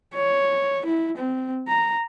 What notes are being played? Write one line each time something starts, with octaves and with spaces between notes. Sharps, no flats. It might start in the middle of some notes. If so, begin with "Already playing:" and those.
C#5
E4
C4
A#5